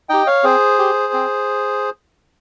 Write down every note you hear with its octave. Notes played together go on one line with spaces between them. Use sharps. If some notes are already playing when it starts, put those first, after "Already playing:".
D#4 G4 D#5 G5
C#5 F5
C4 G#4 C5
G4
C4